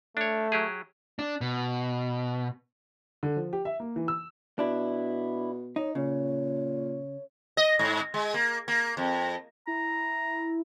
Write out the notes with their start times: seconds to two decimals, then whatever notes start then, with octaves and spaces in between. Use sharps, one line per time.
0.17 A3 D4 C#5
0.52 F#3 G4 G#4
1.19 D4
1.41 B2
3.23 D3
3.36 F3
3.53 G4
3.65 E5
3.80 A#3
3.96 E3
4.08 E6
4.59 B2 D4 E4
5.76 D#4 C#5
5.95 A#2 C#3 C#5
7.57 D#5
7.79 G#2
8.14 G#3
8.34 A#3
8.68 A#3
8.97 F2
9.67 E4 A#5